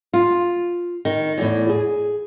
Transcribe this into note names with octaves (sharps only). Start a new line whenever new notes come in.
F4
D#3
E2 A2
G#4